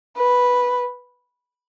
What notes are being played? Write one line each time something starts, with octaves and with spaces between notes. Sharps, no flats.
B4